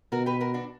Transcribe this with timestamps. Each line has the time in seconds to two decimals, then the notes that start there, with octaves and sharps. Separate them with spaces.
0.12 B2 F#4 A#4
0.26 G4 B4
0.40 F#4 A#4
0.54 D4 F#4